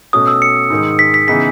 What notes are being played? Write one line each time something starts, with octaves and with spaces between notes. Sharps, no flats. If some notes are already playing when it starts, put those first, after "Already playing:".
B2 A3 C#4 F#4 D#6
E6
C#7
G#2 D#3 G#3
B6
B6
C#3 E3 B3 D#4 G#4 B6